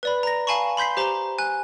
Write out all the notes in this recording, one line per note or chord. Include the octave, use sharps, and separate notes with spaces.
B4 D5 B5
A#5 A#6
F5 G#5 A5 B5 C#6
B5 C6 G6 B6 C7
G4 C5 A#5 G7
G#5 F#6